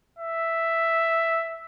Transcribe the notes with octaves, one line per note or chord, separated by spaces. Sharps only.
E5